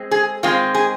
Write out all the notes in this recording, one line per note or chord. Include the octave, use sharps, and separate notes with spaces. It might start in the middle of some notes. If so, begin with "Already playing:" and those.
Already playing: G#3 C4
G#4
D#3 G#3 C4 F4
G#4